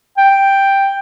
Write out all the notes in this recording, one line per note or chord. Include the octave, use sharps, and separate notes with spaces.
G5